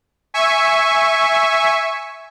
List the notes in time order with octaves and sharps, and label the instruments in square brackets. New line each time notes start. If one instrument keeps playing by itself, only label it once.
[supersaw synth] E5 G#5 C#6